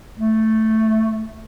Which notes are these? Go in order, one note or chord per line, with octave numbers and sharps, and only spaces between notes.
A3